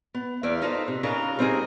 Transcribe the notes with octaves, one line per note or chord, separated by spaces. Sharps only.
B3
E2 D5 E5 F5
D#4 F4 A4 B4 C5 D#5
C3
C#3 D4 D#4 F4 A#4 A#5
G3 C4 D#4 F4 G#4 A#4